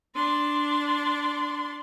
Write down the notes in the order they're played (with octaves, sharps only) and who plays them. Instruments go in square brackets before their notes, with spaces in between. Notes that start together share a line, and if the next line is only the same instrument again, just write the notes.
[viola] D4 C6